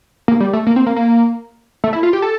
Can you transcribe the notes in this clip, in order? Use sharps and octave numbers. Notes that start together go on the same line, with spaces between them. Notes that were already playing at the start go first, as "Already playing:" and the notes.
A#3
G3
A3
A#3
C4
A#3
A#3
A3
E4
F4
G4
A4